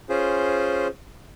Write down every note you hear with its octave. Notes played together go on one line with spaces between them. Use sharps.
C#4 F4 G#4 C5